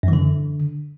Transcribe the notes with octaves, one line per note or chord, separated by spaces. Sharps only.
F#2
E3
D3